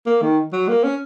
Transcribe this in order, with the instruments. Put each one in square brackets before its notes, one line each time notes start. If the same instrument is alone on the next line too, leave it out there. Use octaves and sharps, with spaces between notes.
[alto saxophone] A#3
D#3
F#3
A#3
C#4